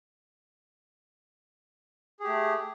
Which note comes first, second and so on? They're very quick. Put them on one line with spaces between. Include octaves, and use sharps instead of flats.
G#4 G4 A3